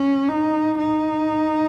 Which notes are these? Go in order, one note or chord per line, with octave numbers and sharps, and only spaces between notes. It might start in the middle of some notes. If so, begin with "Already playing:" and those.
Already playing: C#4
D#4
D#4